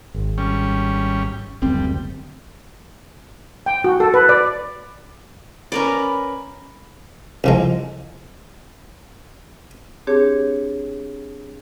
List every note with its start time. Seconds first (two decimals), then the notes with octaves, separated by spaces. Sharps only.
0.14 G#1
0.38 G3 C#4
1.62 F#1 D2 G3 C4
3.66 G5
3.84 F#4
4.00 A4
4.14 B4
4.29 D5
5.72 C#4 A#4 B4 D5
7.44 C2 F3 G#3
10.07 C4 D4 G4 G#4 C#5